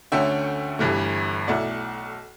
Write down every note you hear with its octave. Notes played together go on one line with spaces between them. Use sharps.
D2 D3 A3 C#4 E5 G5
G1 G2 E3 A3
B1 B2 A3 E4 D5 F#5